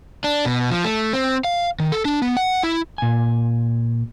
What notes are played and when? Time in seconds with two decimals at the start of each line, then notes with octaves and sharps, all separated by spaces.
0.24 D4
0.45 B2
0.71 F3
0.84 A3
1.13 C4
1.44 F5
1.80 D#3
1.92 A4
2.05 D4
2.22 B3
2.37 F#5
2.63 E4
2.98 A#2 G#5